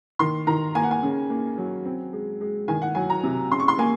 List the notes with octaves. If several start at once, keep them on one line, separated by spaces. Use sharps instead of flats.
D#3 C6
D#3 A#5
A#3 G#5
F#5
G#5
C#3
A#3
F#3
C4
G#3
G#3
D#3 G#5
F#5
F#3 G#5
A#5
C3
C#3 C6
C#6
C6
A#3 G#5